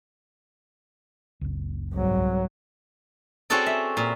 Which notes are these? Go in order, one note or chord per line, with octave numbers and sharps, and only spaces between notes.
F#1 C#2
C2 G#2 F#3
C4 C#4 F#4 G#4 A4 D5
E5
A#2